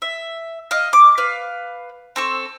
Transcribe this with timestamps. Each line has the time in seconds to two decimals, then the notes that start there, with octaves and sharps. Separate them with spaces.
0.02 E5
0.71 D#5 F5
0.93 D6
1.18 B4 F5
2.16 C4 A4 C#6